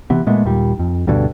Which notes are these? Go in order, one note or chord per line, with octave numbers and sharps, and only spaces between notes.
C3 E3 B3
A#2 G#3 A3 B3
D#2 A#2 G3
F2
D2 G2 B2 D3